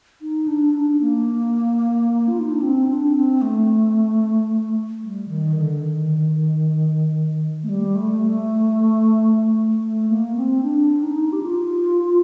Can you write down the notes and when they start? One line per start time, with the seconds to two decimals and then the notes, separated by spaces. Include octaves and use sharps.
0.22 D#4
0.48 D4
0.75 D4
1.01 A#3
2.28 F4
2.39 D#4
2.51 D4
2.62 C4
2.88 D4
3.15 C4
3.42 A3
5.03 G3
5.29 D#3
5.56 D3
5.82 D#3
7.63 A3
7.69 G3
7.96 A3
8.22 A3
9.82 A3
10.09 A#3
10.36 C4
10.62 D4
11.03 D#4
11.33 G4
11.43 F4